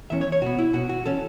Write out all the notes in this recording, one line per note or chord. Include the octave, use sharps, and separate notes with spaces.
E2 E3 C#4 E5
C#5
C#5
B2 B3 F#4
E4
B2 B3 F#4
F#4
E3 C#4 A4